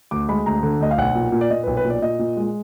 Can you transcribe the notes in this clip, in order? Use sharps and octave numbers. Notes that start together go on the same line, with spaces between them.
D2 D6
G#3 B5
D2 A#5
D3
D2 D#5
F5
B1 F#5
A#2
A#2
D5
A#2 D#5
B1 B4
B4
A#2
D5
A#2 D#5
A#2
G#3